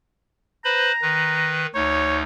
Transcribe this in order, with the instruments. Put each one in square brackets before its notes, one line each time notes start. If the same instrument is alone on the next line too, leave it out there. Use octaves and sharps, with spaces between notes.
[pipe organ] B4 C5 B5 [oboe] A#5
[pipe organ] D#3 B4
[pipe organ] D2 D#4 [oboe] C#5